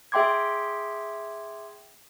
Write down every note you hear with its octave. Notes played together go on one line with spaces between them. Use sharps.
G#4 E5 G5 C6 D6 G#6